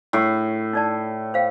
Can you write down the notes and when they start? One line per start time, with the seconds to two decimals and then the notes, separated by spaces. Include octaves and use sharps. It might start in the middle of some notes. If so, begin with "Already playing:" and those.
0.13 A2
0.73 D#4 D5 A5
1.34 C5 F5 G5